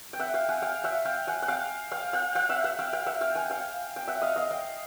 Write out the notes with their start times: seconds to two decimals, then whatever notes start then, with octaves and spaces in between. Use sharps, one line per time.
0.13 G5
0.19 E5 F#5
0.34 F5 G5
0.49 F#5 G#5
0.62 F5 G5
0.84 E5 F#5
1.05 F5 G5
1.27 F#5 G#5
1.42 F#5
1.48 F5 G5
1.92 F5 G5
2.13 F5 G5
2.35 F5 G5
2.49 E5 F#5
2.64 E5 F#5
2.79 F5 G5
2.93 F5 G5
3.06 E5 F#5
3.21 F5 G5
3.35 F#5 G#5
3.50 F5 G5
3.96 G5
4.07 E5 F#5
4.22 D#5 F5
4.36 D#5 F5
4.51 F5 G5